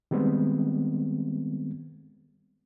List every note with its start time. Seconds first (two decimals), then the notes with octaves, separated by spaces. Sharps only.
0.11 D#3 G3 G#3 B3 C4